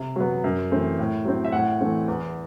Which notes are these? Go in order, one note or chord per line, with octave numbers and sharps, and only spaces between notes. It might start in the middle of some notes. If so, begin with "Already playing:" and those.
Already playing: C3
F#3 B3
F#2
E3 A3 C4
A2
F#3 C4
E5
A2 F#5
E3 A3 C4
E2